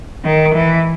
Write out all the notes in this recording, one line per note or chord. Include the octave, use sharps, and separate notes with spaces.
D#3
E3